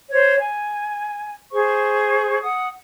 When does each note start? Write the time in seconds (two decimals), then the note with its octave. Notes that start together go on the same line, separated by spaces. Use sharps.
0.12 C5 C#5
0.40 G#5
1.52 G#4 C5 C#6
2.42 F#5 D#6